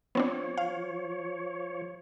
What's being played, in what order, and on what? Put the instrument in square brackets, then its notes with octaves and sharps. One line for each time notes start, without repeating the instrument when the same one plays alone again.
[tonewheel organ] F3 C#5 [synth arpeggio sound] B3 C4 D4
[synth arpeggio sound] F5